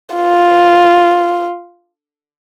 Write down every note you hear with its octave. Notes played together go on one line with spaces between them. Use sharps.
F4